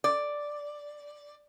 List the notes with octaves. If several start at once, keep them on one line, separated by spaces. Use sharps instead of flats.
D5